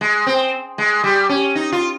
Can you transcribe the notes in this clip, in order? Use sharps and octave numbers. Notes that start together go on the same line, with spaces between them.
G#3
C4
G#3
G3
C#4
D#4
F4